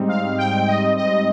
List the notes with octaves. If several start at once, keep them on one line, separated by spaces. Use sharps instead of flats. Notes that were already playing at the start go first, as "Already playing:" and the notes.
Already playing: G#2 G3 C4 D#4
F5
G5
D#5
D#5